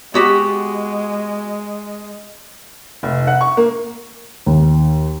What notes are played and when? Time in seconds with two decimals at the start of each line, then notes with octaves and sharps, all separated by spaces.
0.14 G#3 B3 F#4 G4
3.03 F1
3.27 F#5
3.41 C#6
3.57 A#3
4.46 D#2